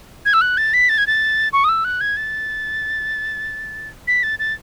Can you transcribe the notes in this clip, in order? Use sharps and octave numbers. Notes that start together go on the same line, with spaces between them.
G#6
E6
F#6
A6
B6
A6
G#6
A6
C#6
D#6
E6
F#6
G#6
A6
B6
A6
A6